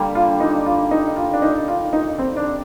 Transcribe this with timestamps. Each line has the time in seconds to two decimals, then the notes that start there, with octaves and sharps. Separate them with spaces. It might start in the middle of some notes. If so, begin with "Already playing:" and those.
Already playing: D3 G3 A#3
0.15 F4
0.40 D#4
0.66 F4
0.91 D#4
1.16 F4
1.33 D4
1.42 D#4
1.68 F4
1.93 D#4
2.18 C4
2.37 D4